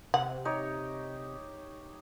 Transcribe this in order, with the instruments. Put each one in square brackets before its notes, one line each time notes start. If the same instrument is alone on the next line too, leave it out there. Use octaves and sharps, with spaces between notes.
[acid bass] C3 [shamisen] F#5
[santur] D#4 G4 C#5